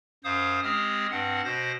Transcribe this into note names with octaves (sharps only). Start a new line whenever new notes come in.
F#2 C5 F5 D#6
G#3 C4 G4 D#6 F6
G2 C4 F#5
B2 C5 A#6